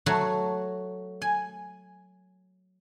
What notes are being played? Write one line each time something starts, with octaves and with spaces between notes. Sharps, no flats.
F#3 A3 F#4
G#5